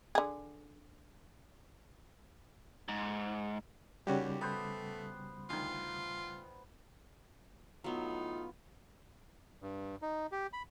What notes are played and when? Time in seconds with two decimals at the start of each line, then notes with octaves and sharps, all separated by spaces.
0.15 D3 G#4
2.88 G#2
4.07 D#2 C#3 G3 C#4 F#4 G4
4.41 A3 B3 C5
5.50 D2 D#3 F4
7.84 A2 F#3 B3 D#4 F4
9.62 G2
10.02 D#4
10.32 G4
10.53 B5